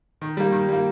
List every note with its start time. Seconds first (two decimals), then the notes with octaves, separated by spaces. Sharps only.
0.22 D#3
0.37 G3 A#3
0.52 D#3
0.68 G3 A#3